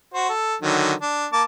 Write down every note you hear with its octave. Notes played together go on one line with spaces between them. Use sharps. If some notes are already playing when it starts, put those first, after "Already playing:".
F#4 C5
A4
D3 D#3 F#3
D4
A#3 A5 D6